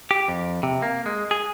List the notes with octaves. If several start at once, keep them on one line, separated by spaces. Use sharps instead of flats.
G4
F2
C3
A#3
G#3
G#4